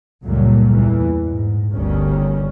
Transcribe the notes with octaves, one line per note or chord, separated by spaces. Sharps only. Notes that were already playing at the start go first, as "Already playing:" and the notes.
C#2 F#2 A#2 F#3 G3 A3
E2 E3
G#2
G1 D2 D#3 G3 C#4